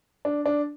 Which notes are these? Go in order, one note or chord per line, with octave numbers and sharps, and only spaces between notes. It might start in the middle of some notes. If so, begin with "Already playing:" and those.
D4
D4